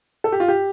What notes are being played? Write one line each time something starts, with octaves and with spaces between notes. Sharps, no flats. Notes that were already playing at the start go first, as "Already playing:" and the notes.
A4
G4
F4
G4